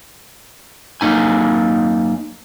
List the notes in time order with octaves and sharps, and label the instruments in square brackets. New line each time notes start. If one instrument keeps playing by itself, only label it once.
[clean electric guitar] F#2 F#3 A#3 D#4 G#5